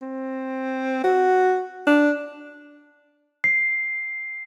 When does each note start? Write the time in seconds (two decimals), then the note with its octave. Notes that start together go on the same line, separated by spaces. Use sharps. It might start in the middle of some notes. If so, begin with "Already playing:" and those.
0.02 C4
1.04 F#4
1.87 D4
3.44 C7